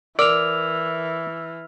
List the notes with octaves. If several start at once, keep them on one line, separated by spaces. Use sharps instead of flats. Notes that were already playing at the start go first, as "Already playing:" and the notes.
E3 A#4 D5 E6 F6 F7